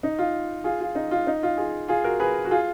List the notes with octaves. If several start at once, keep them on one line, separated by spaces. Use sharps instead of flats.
D#4
F4
F4 G#4
F4
D#4
F4
D#4
F4
F4 G#4
F4 G#4
F#4 A#4
G#4 B4
F#4
F4 G#4